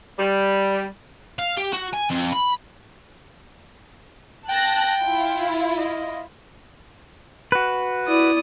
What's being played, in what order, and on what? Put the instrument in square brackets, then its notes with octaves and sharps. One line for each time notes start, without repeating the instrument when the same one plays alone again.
[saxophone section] G3
[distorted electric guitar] F5
G4
F#4
G#5
F2
B5
[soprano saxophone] G5 [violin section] A5 F#6 A#6
[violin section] E4 F4
[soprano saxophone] D#5
[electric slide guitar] F#4 B4
[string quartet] E4 D5 D#6